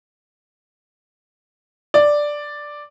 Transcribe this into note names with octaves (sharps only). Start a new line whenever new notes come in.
D5